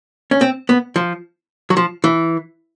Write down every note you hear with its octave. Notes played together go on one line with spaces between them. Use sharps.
C#4
C4
B3
F3
F#3
F3
E3